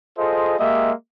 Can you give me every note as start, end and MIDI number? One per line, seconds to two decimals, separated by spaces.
0.18 0.57 65
0.18 0.57 68
0.18 0.57 69
0.18 0.57 72
0.18 0.57 75
0.59 0.91 56
0.59 0.91 58
0.59 0.91 67
0.59 0.91 75
0.59 0.91 76